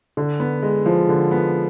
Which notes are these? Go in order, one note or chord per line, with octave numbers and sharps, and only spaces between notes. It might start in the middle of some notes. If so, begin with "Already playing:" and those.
D3
B3
G#3
F3
D3
B3